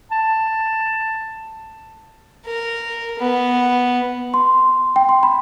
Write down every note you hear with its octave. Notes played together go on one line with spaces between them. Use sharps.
A5
A#4
B3
C6
G5
C6
B5